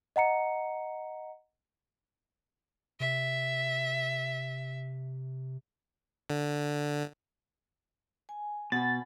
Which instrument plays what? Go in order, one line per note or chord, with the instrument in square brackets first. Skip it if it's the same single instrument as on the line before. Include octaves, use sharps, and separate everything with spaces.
[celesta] D#5 F#5 A#5 C#7
[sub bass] C3 [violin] E5
[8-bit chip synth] D3
[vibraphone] G#5
[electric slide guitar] B2 [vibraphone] F#5 G#5 B5 [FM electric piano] A6